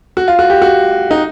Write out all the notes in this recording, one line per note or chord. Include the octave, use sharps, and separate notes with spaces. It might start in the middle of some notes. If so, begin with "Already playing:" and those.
F#4
F4
F#4
G4
F#4
D#4